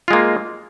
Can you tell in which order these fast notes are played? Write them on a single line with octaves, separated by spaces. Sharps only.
F4 G#3 A#3